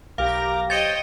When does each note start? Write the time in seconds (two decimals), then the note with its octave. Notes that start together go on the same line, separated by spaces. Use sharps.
0.18 B1 G4 A#4 F5 A#5 D6 A#6
0.70 C5 C#5 D#5 G5 A6 C#7 D#7